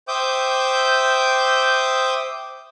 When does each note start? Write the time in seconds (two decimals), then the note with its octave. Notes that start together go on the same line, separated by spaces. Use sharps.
0.08 C5 E5 G5 D6 D#6 G6